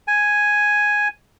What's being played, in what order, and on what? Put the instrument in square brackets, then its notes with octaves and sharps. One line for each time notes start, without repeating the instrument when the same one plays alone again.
[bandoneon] G#5